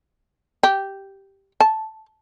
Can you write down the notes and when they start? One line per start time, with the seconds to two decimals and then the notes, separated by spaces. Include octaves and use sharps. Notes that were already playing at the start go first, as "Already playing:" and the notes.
0.63 G4
1.60 A5